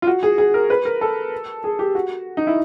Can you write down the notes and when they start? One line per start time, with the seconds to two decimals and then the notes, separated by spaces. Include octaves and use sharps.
0.02 F4
0.07 F#4
0.23 G#4
0.38 G#4
0.54 A#4
0.70 B4
0.85 A#4
1.01 A4
1.64 G#4
1.79 G4
1.95 F#4
2.37 D#4
2.47 E4